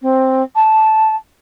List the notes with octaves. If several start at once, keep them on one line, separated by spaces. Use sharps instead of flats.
C4
A5